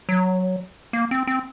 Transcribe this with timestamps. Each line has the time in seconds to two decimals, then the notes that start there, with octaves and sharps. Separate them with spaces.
0.09 F#3
0.93 A#3
1.11 C4
1.27 C4